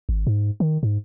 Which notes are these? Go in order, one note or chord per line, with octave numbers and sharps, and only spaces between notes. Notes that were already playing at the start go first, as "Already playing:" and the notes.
G#1
G#2
D#3
G#2